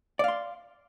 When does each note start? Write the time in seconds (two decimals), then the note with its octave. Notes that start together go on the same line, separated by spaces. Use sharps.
0.19 D5
0.24 F5
0.28 C6